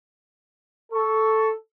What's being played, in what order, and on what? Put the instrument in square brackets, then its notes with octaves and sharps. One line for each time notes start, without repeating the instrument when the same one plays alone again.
[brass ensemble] A4 [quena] C#6